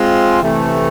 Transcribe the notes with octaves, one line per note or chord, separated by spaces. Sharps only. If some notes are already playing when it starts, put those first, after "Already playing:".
Already playing: G#3 C4 F4
C3 E3 A3